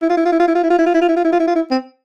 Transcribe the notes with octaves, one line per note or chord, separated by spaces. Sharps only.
E4
F4
E4
F4
E4
F4
E4
F4
E4
F4
E4
F4
E4
F4
E4
F4
E4
F4
E4
F4
E4
C4